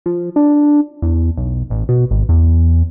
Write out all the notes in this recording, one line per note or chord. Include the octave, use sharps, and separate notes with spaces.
F3
D4
E2
B1
A1
B2
G#1
E2